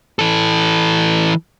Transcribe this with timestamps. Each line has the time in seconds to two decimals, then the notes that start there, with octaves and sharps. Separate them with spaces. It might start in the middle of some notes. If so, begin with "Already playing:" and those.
0.19 E3 A4